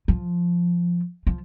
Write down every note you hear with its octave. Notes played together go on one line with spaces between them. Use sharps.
F3
F3